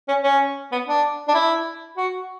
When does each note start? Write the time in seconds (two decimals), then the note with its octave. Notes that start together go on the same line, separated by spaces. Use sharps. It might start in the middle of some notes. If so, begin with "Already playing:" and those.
0.08 C#4
0.23 C#4
0.72 B3
0.88 D4
1.28 D4
1.35 E4
1.97 F#4